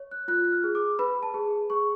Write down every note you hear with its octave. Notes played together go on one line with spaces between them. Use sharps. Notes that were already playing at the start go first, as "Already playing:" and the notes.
Already playing: C#5
F#6
F4 F#6
F#6
F6
G#4
D6
B4 B5
A5
G#4
G#4 C#6